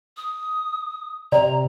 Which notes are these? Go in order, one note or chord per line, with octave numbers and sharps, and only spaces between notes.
D#6
C3 D5 A#5